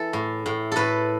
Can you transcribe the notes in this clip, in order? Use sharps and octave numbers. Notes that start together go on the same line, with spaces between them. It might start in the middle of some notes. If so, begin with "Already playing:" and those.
Already playing: E3 A4
A2
A2
A2 A4 B4